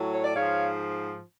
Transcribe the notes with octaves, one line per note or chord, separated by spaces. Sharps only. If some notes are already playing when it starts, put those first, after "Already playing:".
Already playing: A2 F#3
C#5
D5
G#2 F3 C#5 F5